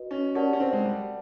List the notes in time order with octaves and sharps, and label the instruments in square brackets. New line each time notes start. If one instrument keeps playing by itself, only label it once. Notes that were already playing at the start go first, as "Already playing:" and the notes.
Already playing: [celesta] F#4 B4 D#5
[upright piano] C#4
[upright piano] C#4 [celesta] G4 A#4 D5 F#5 A5
[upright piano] C#4
C4
G#3
G3